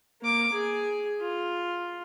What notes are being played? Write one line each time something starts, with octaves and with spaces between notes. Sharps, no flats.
A#3 D6
G#4
F4